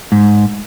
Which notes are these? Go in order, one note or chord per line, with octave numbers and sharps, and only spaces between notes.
G#2